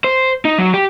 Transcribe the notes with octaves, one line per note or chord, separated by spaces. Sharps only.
C5
D#4
F#3
G4